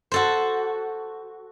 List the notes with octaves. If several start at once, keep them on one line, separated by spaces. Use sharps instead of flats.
F#4 A4 C5